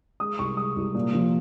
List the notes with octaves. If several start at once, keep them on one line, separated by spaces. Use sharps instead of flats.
G#3 D#6
C2 C#6
G#3 D#6
C2
A#2
F3